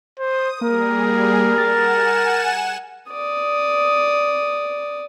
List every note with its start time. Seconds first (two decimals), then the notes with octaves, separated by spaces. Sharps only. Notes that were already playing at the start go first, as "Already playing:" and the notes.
0.19 C5 D#6
0.61 G3 A#3 G#4 A#4
1.58 F#5 G#5 A6 E7
3.11 D5 D#6